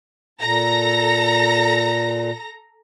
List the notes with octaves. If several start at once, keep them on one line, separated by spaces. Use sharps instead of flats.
A#2 A4 A#5 A#6